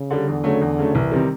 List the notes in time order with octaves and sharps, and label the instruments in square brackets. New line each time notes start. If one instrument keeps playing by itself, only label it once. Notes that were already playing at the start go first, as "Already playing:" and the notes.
Already playing: [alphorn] C#3
[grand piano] D3 G3
[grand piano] E2 [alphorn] D3
[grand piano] C#3 F#3 A3
E2
C#3 F#3 A3
[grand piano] C2 [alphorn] E3
[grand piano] C3 D#3 G3